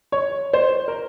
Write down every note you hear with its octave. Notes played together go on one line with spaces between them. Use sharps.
C#5
C5
A#4